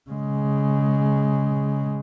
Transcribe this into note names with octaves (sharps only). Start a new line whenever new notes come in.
C#3 G#3